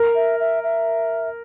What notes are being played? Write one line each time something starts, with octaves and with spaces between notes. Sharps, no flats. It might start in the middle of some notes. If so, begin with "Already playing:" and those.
Already playing: A#4
E5
E5
E5